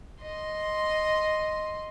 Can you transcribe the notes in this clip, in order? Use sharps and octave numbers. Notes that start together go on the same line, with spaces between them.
D#5 C6